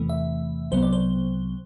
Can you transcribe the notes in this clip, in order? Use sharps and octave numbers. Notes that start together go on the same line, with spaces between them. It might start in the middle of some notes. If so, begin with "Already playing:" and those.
Already playing: E2 C3 E3 A3
E5
C2 C3 F#3 B3 C5
D5
C5